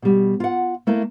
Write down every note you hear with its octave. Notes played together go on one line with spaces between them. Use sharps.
B2 G3
F4 F#5
A3 A#3 E4